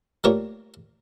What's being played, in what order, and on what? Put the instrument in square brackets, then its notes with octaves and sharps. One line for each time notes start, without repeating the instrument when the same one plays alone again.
[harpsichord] G3 A3 A#3 F4 A#4 C#5